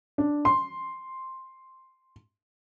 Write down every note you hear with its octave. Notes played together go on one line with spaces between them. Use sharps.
D4
C6